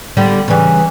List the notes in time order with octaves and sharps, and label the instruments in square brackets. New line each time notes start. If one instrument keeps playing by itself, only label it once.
[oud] D3 G3 B3
[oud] C#3 G3 [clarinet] E3